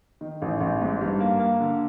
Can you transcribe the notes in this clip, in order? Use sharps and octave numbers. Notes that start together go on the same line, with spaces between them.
D#3
A1
A1
G#2
G2
A#3
A#3
D3